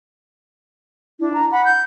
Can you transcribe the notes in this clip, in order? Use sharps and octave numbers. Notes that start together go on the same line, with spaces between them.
D4 E4
A#5
F#5 B5
G6